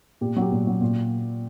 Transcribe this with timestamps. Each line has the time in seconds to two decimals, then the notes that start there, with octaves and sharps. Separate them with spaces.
0.21 A#2 G4
0.36 F#3
0.42 G4
0.52 A#2
0.67 F#3
0.81 A#2